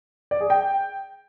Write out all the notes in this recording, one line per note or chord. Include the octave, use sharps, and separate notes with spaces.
D5
G#4
G5